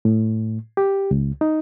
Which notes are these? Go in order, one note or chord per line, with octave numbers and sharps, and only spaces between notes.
A2
G4
C#2
D#4